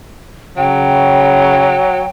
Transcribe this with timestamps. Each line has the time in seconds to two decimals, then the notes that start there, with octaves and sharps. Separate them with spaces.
0.57 C#3 F#3 G5